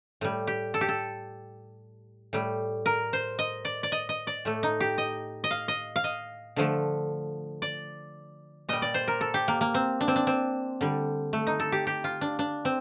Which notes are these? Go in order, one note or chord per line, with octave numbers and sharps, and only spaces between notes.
A2 G3
G4
A4
G4
A4
A2 G3
A#4
C5
D#5
D5
D5
D#5
D#5
D5
A2 A3
D#4
G4
D#5
D#5
F5
D#5
F5
D#5
D3 F3 A3
D5
A#2 G3 D#5
D5
C5
A#4
A4
G4
A#3
A#3
C4
D4
C4
D4
C4
D3 G3
A3
D#4
A4
G4
G4
F4
D4
D4
C4